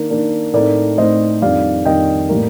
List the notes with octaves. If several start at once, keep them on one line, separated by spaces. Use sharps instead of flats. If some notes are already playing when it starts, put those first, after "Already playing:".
Already playing: D#3 A#3 D4
D#3 A#3 D4
A2 A3 C4 D#4 A#4 D5
A2 A3 C4 D#4 C5 D#5
F2 D#3 G3 D4 D5 F5
F2 D#3 G3 D4 D#5 G5
A2 G3 A#3